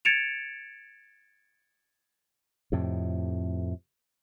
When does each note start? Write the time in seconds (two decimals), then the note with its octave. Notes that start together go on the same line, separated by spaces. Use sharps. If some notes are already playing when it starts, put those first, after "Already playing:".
0.05 G#6 A6 C#7 D7 E7 F7
2.72 F2 A2 C3